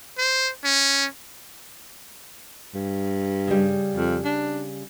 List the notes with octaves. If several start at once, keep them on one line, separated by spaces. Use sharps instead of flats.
C5
C#4
G2
C#3 G3
F2
D4